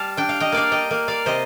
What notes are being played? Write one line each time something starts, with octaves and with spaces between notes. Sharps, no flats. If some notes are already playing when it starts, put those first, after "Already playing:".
Already playing: G3 F5 A5
D4 G5
F5
D#5 G5
A#3 D5 F5
D#5 G5
A#3
D5 F5
C3 C5 D#5